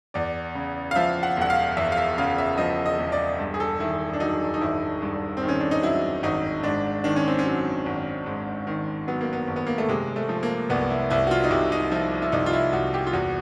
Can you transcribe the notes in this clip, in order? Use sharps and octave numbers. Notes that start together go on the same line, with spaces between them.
E2 D5
C#3
F5
F3 E5
F#5
E1 F#5
F5
E2 E5
F5
E5
C#3 F5
E5
F3 D#5
D#5
E1
D5
G2
G#4
A4
D#3 E4
D4
F#3 D#4
D#4
G#1 E4
G2
C4
D#3
C#4
D4
D#4
F#3 E4
G#1 D#4
G#2 D4
D#3 D4
C#4
C4
C#4
F#3
G#1
G#2
D#3
F#3 B3
A#3
B3
G#1
B3
A#3
A3
C3 G#3
A3
F3
A#3
C2 B3
E4
C2 E4
F#4
F4
D#4
C3 E4
D#4
F3 E4
E4
C2 D#4
F4
E4
C2 F#4
G4
F4
E2 F#4